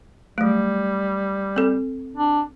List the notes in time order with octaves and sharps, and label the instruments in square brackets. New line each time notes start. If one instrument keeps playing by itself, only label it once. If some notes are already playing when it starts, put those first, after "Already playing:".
[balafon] F#3 A3 [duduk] G3
[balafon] C4 A4
[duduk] D4